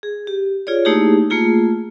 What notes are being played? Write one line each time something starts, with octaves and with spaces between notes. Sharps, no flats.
G#4
G4
F4 G#4 C#5 D5
A3 A#3 D#4 E4 G4 G#4
A3 A#3 F4 G#4